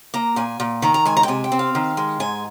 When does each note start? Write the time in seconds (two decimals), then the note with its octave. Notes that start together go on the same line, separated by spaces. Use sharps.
0.14 A#3 A#5
0.36 A#2 G#5
0.60 A#2
0.82 D#3 A#5
0.94 A#5
1.05 G#3 G#5
1.17 A#5
1.23 G5
1.28 C3 G#5
1.44 G5
1.52 C4
1.59 F5
1.75 D#3
1.97 G#3
2.20 G#2 G#5